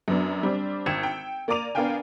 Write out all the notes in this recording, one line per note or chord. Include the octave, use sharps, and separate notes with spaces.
F#2 F#3 B3 D4
G3 C4 D4
G#1 G5 E6 G#6 C#7 E7
G5
A#3 D5 A#5 D6 D#7 F7
B3 D4 A#4 F5 G5 G#5